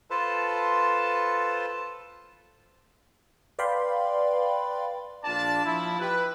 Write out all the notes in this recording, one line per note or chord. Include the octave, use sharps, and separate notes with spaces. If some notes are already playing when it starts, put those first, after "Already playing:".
F4 A4 B4 C5 A5
B4 D5 F5 G5 B5 C6
A#1 D4 F4 D5 A5
F3 E4
G4 B4